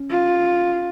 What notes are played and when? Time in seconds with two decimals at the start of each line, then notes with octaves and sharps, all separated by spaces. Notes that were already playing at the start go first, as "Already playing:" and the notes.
Already playing: C#4
0.10 F4